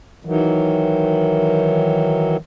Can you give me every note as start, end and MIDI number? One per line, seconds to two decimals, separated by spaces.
0.25 2.37 51
0.25 2.37 52
0.25 2.37 54